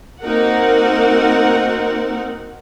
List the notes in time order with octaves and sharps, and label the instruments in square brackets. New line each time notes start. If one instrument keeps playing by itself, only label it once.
[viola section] A#3 C4 D#4 F#4 A#4 F#5